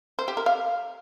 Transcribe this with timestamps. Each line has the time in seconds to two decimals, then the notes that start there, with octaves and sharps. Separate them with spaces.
0.19 C5
0.28 G4
0.37 A#4
0.46 F5